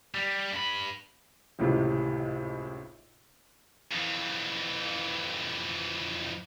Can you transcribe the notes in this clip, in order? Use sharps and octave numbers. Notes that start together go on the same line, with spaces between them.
G3
G2 B5
G#1 C#2 A2 C3
F2 E3